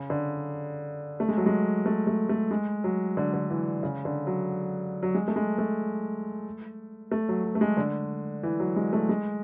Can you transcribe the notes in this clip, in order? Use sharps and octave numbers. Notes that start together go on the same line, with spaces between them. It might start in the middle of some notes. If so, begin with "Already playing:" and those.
Already playing: C#3
D3
A3
G#3
F#3
G#3
A3
A3
A3
G#3
F#3
D3
D3
E3
C#3
D3
F#3
F#3
G#3
A3
G#3
A3
A3
F#3
F#3
A3
G#3
D3
E3
F#3
G#3
A3
G#3